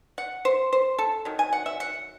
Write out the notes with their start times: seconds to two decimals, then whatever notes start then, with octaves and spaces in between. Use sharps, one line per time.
0.18 F#5
0.45 C5
0.73 C5
0.99 A4
1.25 D#3 F#3
1.39 G#5
1.53 F#5
1.66 E5
1.80 F#5